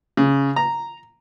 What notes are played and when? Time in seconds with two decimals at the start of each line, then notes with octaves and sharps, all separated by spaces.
0.17 C#3
0.56 A#5